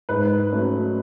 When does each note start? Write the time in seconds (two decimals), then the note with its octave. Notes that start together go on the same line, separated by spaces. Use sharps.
0.09 G#2 B4
0.52 F#3 A3 C#4